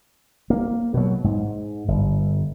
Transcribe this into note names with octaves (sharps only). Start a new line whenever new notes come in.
A#3
B2 F#3
G#2
G1